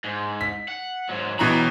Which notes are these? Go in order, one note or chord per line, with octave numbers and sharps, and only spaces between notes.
G#2
B6
F#5
G#2 F#3
B2 E3 F#3 G4 A#5